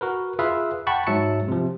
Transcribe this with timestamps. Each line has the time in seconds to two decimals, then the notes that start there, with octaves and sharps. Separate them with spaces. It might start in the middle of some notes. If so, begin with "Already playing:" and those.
0.01 F#4 A#4 B4
0.39 F4 G#4 B4 E5 F5
0.87 F#5 G5 A5 B5 C#6
1.07 G#2 F#3 E5 A5 C#7
1.48 C3 F3